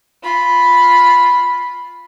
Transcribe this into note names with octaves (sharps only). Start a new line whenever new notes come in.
F4 B5